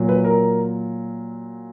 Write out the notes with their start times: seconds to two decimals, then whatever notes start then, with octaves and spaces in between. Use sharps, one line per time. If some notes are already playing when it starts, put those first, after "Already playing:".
Already playing: A#2 F#3
0.09 B4
0.24 A#4